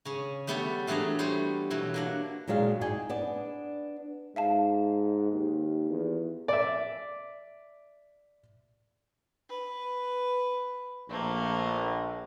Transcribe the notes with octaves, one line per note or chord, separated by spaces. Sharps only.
C#3 C#4
G3 A3 B3 G4 A4 C#5
E3 F#3 A3 D4 G#4 A#5
G3 A3 B3 C5 C#5
B2 E3 F#3
A#3 D4 F#5
A#2 F#3 G#3 D4 F5 G5
D#4 D5 G5 G#5
B3 D4 D5
G#2 E5 F5 A5
D#2
E2
D5 E5
B4
A#1 A3 A#3